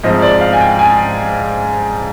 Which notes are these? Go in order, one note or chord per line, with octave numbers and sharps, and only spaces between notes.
G#2 F3 C4 D#5
D5
F5
G#5
G5
G#5